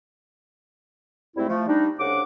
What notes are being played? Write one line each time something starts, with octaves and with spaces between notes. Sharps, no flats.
G#2 G3 A3 C4 E4
F3 A3
G3 D4 D#4
C2 C#3 D4 F#5 D6